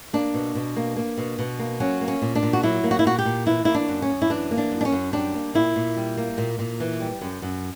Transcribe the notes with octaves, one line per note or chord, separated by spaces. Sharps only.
A#3 D4
B2
B2
A#3
A#3
B2
B2
A#3
F#3 C#4
A#3
C#4
A#2
D4
A#2
F#4
F#3 E4
A#3
F#4
E4
A#2 F#4
G4
A#2
E3 E4
A#3 E4
D4
F#2
C#4
F#2
E4
E3 D4
A#3
D4
F#2
D4
C#4
F#2
G3 D4
A#3
A#2 E4
A#2
G3
A#3
A#2
A#2
E3
G3
F#2
F#2